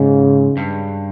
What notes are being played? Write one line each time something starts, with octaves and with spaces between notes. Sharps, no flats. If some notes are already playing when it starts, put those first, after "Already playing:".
Already playing: G#2 C#3
G2